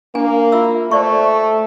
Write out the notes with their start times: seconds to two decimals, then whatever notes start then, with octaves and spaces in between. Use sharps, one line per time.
0.15 A#3 D4 G#5
0.52 F4 E5 E6
0.91 A3 C5 D5 C#6